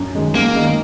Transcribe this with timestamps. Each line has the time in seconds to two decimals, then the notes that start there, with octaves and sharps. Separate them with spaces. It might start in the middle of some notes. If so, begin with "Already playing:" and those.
Already playing: F#2
0.15 D#3 G#3
0.35 F#2 A#3
0.55 D#3 G#3